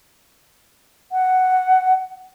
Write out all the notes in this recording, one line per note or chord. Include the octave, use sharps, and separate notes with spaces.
F#5